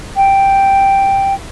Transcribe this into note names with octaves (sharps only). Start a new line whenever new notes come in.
G5